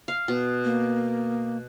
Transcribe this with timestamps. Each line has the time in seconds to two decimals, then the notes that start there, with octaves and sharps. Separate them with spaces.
0.08 F5
0.28 B2
0.64 A#3